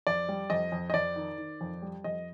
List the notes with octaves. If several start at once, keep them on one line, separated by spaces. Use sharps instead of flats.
F2 D5
G3
F2 D#5
F2
D#5
F2 D5
D#3
D#3
F2
G3
F2 D#5